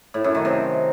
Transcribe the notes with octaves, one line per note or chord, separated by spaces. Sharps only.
A2
F#2
D#3
C3